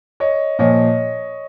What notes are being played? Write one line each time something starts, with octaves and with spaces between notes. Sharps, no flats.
C#5 D#5
A#2 F3 C#5 D#5